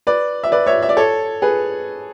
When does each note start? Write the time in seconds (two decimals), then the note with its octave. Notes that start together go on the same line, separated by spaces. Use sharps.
0.07 B4 D5
0.44 E5
0.52 B4 D5
0.66 C#5 E5
0.83 E5
0.89 D5
0.97 A4 C#5
1.42 G#4 B4